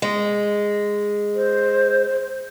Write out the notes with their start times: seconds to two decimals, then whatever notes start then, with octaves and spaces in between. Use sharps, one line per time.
0.02 G#3
1.35 C5